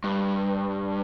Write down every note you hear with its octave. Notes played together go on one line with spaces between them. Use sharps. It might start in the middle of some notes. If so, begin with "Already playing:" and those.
G2